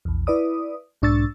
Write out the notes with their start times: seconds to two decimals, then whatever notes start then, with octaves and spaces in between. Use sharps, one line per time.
0.05 A#1 E2
0.27 E4 B4 D5 D#6
1.02 B1 G#2 D4 C#6 E6 A6